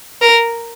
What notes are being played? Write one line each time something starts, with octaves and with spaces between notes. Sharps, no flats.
A#4